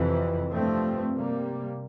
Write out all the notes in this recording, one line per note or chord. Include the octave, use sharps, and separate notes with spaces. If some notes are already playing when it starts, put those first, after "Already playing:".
Already playing: F2 C3 E3
G2 F3 A3 C4
C3 G3 A#3